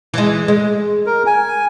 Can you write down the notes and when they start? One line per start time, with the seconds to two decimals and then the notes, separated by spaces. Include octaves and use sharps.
0.14 E3 G#3
0.48 G#3
1.06 A#4
1.26 G#5